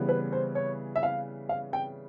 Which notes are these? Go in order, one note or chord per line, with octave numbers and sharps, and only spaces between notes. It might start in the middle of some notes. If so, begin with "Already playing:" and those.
Already playing: C#3 E3 G3 B3
B4
C5
C#5
E5
F5
F5
G5